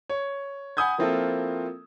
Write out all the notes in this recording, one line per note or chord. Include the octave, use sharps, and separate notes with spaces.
C#5
F#5 G#5 B5 D#6 G6 G#6
F3 A#3 C4 E4 F4 A4